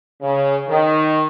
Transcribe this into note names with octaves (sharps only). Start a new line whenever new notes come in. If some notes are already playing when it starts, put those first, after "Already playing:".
C#3
D#3